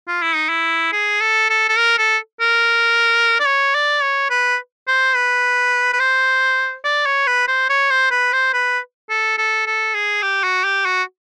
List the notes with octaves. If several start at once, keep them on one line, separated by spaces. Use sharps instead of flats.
F4
E4
D#4
E4
G#4
A4
A4
A4
A#4
A4
A#4
D5
C#5
D5
C#5
B4
C5
B4
B4
C5
D5
C#5
B4
C5
C#5
C5
B4
C5
B4
A4
A4
A4
G#4
G4
F#4
G4
F#4